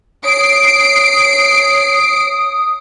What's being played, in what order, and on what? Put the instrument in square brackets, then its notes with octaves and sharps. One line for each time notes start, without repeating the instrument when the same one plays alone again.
[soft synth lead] C#5 [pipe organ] D#6 [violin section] C7 D7